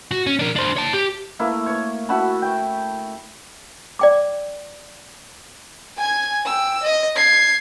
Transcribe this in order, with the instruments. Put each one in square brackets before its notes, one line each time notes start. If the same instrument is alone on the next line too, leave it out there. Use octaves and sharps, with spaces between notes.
[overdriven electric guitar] F#4
C#4
D4 A#4
D4 C5
C#5 A5
G4
[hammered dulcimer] A3 A#3 E4
C#5
E4 F#4 A5 B5
G5
[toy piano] D5 G5 D6
[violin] G#5 G#6
G5 E6
D#5
G#6 C7